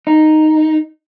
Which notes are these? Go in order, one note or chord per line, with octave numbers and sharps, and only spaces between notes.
D#4